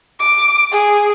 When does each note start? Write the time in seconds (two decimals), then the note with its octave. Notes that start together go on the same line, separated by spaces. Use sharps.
0.20 D6
0.72 G#4